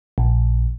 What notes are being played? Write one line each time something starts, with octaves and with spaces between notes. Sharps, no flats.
A#1